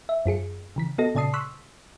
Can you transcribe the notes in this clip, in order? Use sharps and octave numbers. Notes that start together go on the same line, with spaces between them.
E5
F#2 F4 G#4 C#7
C#3 E3 B6
B3 F#4 A4 D#5 A#6
A#2 C#3 D5 A5 D#6 C7
C6 C#6 D#6 E6 F#6 B6